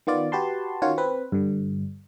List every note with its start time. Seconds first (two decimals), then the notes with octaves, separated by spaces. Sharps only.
0.07 D#3 B3 F4 D5
0.32 F#4 G4 B4 A5 C6
0.82 D#3 C#4 F4 F#4 C#5
0.98 C4 B4
1.32 G2 D3